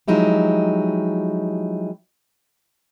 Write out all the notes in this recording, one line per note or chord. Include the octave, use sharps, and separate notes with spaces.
F3 F#3 G#3 D#4 E4 G4